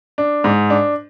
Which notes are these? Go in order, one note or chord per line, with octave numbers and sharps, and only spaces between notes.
D4
G#2
D4